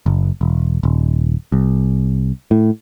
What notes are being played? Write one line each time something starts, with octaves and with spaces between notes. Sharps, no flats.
F#1
E1
D#1
C2
A2